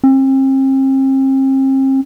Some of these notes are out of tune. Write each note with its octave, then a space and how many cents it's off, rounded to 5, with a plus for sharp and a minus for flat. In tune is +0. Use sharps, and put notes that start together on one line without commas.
C4 +40